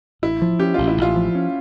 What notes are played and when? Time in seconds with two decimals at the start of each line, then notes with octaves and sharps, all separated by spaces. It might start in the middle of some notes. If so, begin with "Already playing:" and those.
0.22 A1 E4
0.42 F3
0.59 C#4 G4
0.74 A1 F4
0.88 E4
0.97 A1 F4
1.16 F3
1.35 C#4